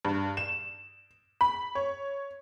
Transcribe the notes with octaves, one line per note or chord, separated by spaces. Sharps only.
G2
E7
B5
C#5